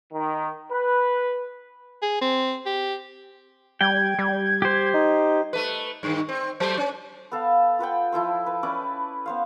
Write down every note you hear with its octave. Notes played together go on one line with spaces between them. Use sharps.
D#3
B4
G#4
C4
G4
G3 G5 G#6
G3
G4 C5
D#4
A3 B4
G2 D#3
C4
F#3 A3 C5
C#4
B3 A4 F5
F4 B4 F#5 G5
F3 E4 A4 C5
B4
C#4 E4 B4 D5
B3 C5 F5